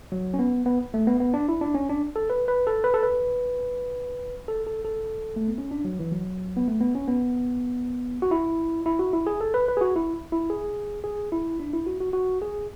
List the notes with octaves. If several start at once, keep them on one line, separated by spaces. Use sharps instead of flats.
F#3
C#4
B3
B3
A3
B3
B3
D4
E4
D4
C#4
D4
A4
B4
B4
A4
B4
A4
B4
A4
A4
A4
A3
B3
C#4
D4
F#3
E3
F#3
B3
A3
B3
C#4
B3
F#4
E4
E4
F#4
E4
G#4
A4
B4
B4
G#4
F#4
E4
E4
G#4
G#4
E4
D4
E4
F#4
F#4
F#4
G#4